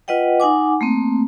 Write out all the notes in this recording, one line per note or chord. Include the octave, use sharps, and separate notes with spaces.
F4 B4 D#5 F#5 G5
D#4 F#5 G#5 D6
A3 A#3 C4